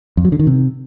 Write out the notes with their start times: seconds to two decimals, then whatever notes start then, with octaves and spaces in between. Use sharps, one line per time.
0.17 F2
0.25 F#3
0.32 D3
0.39 D#3
0.47 C3